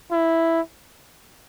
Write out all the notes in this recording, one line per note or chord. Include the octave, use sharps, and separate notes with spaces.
E4